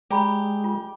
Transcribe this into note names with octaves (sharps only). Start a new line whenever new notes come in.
G#3 G4 D5 A#5 B5
F4